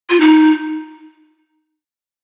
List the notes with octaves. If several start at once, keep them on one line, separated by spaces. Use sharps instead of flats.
F4
D#4